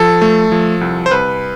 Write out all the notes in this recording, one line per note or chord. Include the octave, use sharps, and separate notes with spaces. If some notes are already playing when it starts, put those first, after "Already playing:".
Already playing: F3 A4
A3
F3
C2
C5
C2 B4